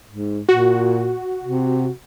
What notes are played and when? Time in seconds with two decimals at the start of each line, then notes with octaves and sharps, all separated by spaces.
0.11 G#2
0.49 A#2 F#4
1.43 C3